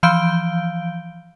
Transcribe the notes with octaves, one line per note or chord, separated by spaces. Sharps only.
E3 F3 F5 G6 D7 G7